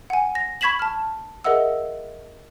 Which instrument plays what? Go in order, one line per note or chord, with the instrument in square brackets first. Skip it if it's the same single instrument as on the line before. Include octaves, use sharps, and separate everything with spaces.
[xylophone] F#5 G#5
A#6
B5 C#6 G#6 B6 E7 F#7
A5 F6
G#4 A#4 D#5 E5 F#5 E6